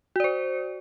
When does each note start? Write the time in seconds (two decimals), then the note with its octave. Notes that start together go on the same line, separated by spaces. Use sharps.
0.16 F#4
0.20 D5
0.24 C5